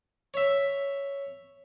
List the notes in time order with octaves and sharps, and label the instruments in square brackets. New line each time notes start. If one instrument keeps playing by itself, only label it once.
[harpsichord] C#5 E5